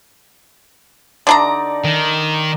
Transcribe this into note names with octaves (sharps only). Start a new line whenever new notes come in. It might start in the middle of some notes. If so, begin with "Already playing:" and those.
D3 D4 D#4 D5 A#5
D#3